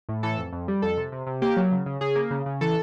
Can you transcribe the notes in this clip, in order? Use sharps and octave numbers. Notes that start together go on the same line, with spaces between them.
A2
E3 A4
F2
F2
G3
F2 A4
C3
C3
C3
A#3 G4
F#3
C#3
C#3
C#3 G#4
A#3
C#3
C#3
E3 A4